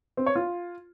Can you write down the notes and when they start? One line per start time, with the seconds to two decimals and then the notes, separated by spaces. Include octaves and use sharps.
0.17 C4
0.26 C#5
0.36 F4